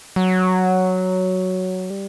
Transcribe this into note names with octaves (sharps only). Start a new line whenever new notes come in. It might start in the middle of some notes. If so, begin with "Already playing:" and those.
F#3
G3